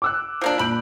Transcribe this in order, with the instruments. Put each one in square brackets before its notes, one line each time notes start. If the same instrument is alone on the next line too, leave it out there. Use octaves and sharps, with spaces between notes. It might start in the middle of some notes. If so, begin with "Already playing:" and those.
[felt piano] D6 E6 F#6
[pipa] F3 A#3 D4
[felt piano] A#2 G6 D7 [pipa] B5